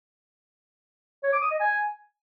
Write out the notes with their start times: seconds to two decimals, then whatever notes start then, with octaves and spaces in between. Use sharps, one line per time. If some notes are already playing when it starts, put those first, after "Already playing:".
1.24 C#5
1.33 D6
1.42 D#6
1.51 D#5
1.60 G#5